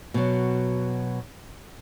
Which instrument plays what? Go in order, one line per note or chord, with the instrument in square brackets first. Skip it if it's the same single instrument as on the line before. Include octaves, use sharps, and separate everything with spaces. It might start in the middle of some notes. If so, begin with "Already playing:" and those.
[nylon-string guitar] B2 F#3